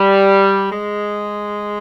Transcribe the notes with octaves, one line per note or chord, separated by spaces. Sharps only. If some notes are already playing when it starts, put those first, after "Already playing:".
Already playing: G3
G#3